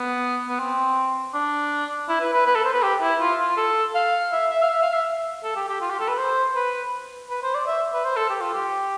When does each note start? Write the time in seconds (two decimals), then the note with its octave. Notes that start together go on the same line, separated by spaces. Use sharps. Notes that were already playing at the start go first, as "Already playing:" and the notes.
Already playing: B3
0.48 B3
0.59 C4
1.34 D4
2.09 E4
2.20 B4
2.33 B4
2.46 B4
2.55 A4
2.64 C5
2.73 B4
2.83 G4
3.01 E4
3.20 F4
3.39 F4
3.57 A4
3.95 F5
4.32 E5
4.50 E5
4.63 F5
4.69 E5
4.82 F5
4.94 E5
5.44 A4
5.56 G4
5.69 G4
5.81 F4
5.90 G4
6.00 A4
6.08 B4
6.18 C5
6.56 B4
7.30 B4
7.42 C5
7.54 D5
7.67 E5
7.93 B4
8.05 C5
8.16 A4
8.30 G4
8.41 F4
8.54 G4